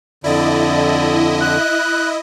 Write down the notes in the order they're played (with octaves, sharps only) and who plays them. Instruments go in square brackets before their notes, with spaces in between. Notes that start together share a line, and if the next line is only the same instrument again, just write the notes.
[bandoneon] F2 D3 [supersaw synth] E4 D#5 [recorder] D5
[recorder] F#6